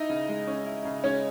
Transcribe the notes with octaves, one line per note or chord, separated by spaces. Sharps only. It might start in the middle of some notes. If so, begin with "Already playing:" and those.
Already playing: D#4 E4 D#5
C#3
G#3
C#4
E4
C#3
G#3 C#4 C#5